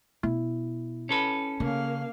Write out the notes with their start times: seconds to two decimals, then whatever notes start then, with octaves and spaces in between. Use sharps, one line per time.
0.23 B2 E4
1.09 C#4 A4 B4
1.60 C#3 A#3 F5